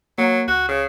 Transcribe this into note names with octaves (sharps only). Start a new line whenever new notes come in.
F#3 A#3
C#2 F#4
C#3